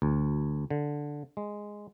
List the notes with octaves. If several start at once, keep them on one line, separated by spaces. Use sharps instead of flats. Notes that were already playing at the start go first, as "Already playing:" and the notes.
D2
D3
G#3